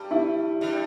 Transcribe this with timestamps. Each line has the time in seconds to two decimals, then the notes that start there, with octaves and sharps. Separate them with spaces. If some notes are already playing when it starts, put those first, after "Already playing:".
Already playing: G2 G3
0.11 E4
0.61 G2 G3